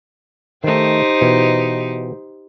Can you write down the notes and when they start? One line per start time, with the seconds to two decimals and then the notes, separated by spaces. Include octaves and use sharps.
0.64 D#3 A3 D#4 G4 C5
1.21 B2 E3